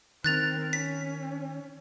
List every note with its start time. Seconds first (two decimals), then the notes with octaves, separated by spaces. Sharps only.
0.24 D#3 C4 A#4 F#6 A6 F7
0.73 C#4 B6